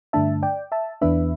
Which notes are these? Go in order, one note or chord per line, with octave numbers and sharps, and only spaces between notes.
G2 D3 A3 D4 E5 A5
D5 G5
E5 A5
E2 E3 B3 D4 B4 E5